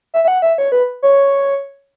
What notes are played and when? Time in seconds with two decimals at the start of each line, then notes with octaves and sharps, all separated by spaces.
0.14 E5
0.24 E5
0.28 F#5
0.42 E5
0.58 C#5
0.72 B4
1.03 C#5